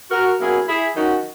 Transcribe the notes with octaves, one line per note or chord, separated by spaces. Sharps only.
F#4 A#4
B2 F#3 A#3 C#4 E4 G#4
E4 G#4
D#3 F#3 C#4 D#4 F#4